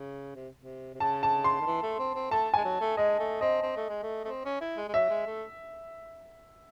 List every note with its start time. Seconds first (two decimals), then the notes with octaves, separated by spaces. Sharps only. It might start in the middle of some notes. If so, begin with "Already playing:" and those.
Already playing: C#3
0.35 C3
0.61 C3
0.95 C3
1.00 C#3 A5
1.23 A5
1.44 C6
1.60 D#3
1.66 E3
1.82 A3
1.99 C4
2.15 C4
2.31 A3 A5
2.54 G#3 G#5
2.65 F#3
2.80 A3
2.97 G#3 D#5
3.19 A3
3.41 C4 D#5
3.62 C4
3.76 A3
3.89 G#3
4.03 A3
4.25 A3
4.28 C4
4.45 C#4
4.61 E4
4.77 G#3
4.88 G#3
4.94 F#3 E5
5.10 G#3
5.26 A3